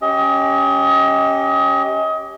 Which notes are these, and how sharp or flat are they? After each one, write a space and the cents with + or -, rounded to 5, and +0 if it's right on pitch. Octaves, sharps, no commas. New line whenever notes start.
C#4 +0 G4 +0 D#5 +30